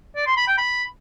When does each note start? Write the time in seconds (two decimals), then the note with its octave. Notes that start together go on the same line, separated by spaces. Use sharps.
0.16 D5
0.27 C6
0.37 B5
0.48 G5
0.58 B5